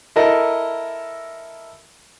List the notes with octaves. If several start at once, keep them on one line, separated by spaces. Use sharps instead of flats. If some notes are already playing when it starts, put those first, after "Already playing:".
E4 A4 A#4 D#5